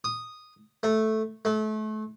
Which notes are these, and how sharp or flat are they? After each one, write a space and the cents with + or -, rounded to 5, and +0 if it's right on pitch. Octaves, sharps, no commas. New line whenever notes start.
D#6 -5
A3 -5
A3 -30